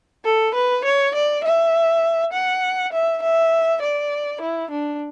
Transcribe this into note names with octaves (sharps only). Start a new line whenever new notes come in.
A4
B4
C#5
D5
E5
F#5
E5
E5
D5
E4
D4